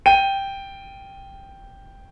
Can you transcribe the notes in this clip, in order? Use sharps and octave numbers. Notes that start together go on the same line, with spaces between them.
G5 D#7